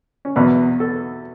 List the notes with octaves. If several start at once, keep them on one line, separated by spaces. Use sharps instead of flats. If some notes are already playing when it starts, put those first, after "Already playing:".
C#4
E2 B2 F#3 B3
A4